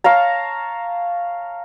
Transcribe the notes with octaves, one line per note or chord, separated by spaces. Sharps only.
C#5 F5 A5 A#5